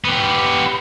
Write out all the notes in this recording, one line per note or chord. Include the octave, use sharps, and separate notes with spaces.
B3 G4